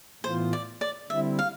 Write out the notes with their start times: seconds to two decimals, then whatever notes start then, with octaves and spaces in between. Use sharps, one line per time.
0.24 A2 E3 B3 F4 C5
0.53 D5
0.81 D5
1.10 D3 G3 C4 E4 E5
1.39 F5